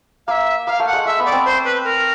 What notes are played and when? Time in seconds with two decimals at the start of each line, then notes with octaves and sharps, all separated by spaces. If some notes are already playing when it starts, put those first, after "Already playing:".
0.27 A#3 E5 F5
0.66 A#3 F5
0.80 A3
0.86 F#5
0.93 G#3
1.05 A3 E5
1.19 B3
1.25 D5
1.31 C4
1.45 C5
1.65 B4
1.84 A#4